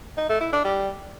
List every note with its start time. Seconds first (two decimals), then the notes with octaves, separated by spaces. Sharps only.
0.17 D#4
0.29 A3
0.41 E4
0.53 D4
0.64 G3